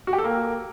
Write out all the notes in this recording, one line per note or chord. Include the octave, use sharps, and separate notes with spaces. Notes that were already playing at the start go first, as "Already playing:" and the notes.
F#4
G4
A4
A#3